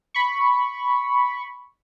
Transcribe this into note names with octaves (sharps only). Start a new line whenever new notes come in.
B5 C#6